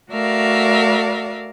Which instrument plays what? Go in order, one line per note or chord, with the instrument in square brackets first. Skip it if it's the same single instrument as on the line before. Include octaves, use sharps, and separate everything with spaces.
[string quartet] A3 F#4 A#4 D5 E5 F5